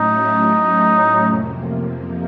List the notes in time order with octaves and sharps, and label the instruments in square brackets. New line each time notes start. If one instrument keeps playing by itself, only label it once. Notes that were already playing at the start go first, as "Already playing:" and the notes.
Already playing: [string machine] A2 F#3 A3 C#4 [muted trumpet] D#4
[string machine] F2 C3 F3 A#3